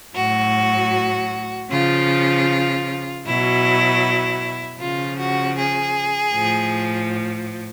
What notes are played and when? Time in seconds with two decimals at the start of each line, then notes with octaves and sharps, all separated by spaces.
0.15 A2 F#3 F#4
1.70 C#3 F3 F4
3.25 B2 F#3 E4
4.80 C#3 F3 F4
5.19 F#4
5.57 G#4
6.35 A2 F3